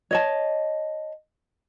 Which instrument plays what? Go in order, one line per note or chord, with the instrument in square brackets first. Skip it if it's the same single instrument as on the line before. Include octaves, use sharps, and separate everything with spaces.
[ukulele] C#5 D#5 A5